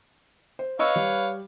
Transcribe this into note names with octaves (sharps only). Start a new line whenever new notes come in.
C5
B4 C#5 D#5 F5 C#6 E6
G3